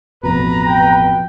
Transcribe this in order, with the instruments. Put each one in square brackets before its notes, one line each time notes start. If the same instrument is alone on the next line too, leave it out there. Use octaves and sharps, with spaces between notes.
[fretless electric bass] A1 F2 B2 [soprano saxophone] B4 [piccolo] A#5
[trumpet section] G5